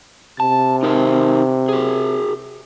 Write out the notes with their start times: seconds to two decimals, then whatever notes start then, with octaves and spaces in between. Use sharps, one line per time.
0.40 C3 A5
0.83 D#4 A#4 C5
1.69 F#4 G#4